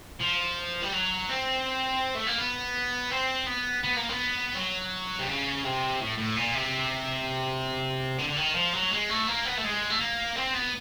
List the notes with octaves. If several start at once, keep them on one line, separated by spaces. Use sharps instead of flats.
F3
G3
F#3
C4
A3
A#3
B3
C4
B3
B3
A#3
B3
F#3
C3
C#3
C3
A2
A2
A#2
C3
D3
D3
D#3
F3
F#3
G#3
A3
A#3
B3
A3
G#3
A3
A#3
C4
B3